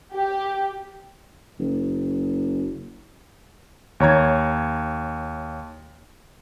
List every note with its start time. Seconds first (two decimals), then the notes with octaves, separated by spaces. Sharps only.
0.13 G4
1.59 F#1
4.00 D#2 C#5 A#5 G#6